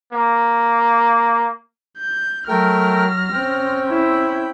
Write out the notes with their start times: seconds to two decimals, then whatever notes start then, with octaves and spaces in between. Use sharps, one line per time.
0.13 A#3
1.98 G6
2.48 F#3 A3 A#4 G5 F6 A#6
3.33 C4 C#4 G5
3.88 E4